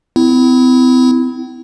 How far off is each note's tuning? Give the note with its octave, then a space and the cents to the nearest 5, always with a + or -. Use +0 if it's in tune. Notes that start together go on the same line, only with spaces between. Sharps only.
C4 -40 E4 +0